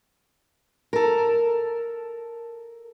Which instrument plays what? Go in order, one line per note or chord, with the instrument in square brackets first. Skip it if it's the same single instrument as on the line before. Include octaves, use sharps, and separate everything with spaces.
[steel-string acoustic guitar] A4 A#4